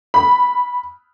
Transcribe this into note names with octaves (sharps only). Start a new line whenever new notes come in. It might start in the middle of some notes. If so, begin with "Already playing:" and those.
B5